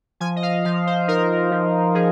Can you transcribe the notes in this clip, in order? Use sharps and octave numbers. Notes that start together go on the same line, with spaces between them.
F3 G#5
D#5
F5
F3 F5
C5
D#4 A#4
F3
F3 G#4